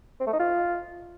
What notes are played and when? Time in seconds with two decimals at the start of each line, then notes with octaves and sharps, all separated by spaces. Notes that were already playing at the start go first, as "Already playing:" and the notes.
0.20 C4
0.27 A3
0.33 D#4
0.40 F4